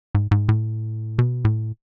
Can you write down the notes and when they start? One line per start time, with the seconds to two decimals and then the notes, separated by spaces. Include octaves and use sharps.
0.15 G#2
0.31 G#2
0.49 A2
1.19 B2
1.45 A2